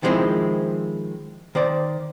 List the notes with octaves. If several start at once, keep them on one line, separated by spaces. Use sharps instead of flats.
D#3 F3 G#3 C4 E4
D#3 C5 D5